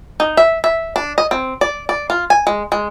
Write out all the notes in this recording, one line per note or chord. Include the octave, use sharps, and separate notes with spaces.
D#4
E5
E5
D4
D#5
C4
D5
D5
F4
G#5
G#3
G#3